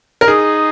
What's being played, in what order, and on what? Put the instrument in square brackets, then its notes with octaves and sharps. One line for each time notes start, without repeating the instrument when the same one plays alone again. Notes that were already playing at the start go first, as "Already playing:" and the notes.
[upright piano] A#4
[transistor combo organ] D#4 [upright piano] G#4